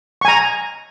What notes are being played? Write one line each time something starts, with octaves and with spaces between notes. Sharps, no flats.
G#5 A#5 C#6